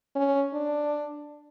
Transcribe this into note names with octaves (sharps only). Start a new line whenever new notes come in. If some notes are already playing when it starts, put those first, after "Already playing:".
C#4
D4